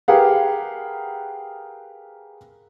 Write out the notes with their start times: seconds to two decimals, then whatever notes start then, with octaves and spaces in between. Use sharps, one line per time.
0.08 G4 G#4 A#4 B4 F5 F#5